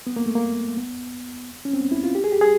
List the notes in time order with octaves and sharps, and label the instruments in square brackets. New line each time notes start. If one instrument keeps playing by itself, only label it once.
[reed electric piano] B3
A#3
A3
A#3
B3
C#4
C4
B3
E4
F4
G4
G#4
G4
G#4